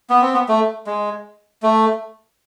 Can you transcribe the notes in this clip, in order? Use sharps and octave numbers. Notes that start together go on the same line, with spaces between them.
B3
C4
B3
A3
G#3
A3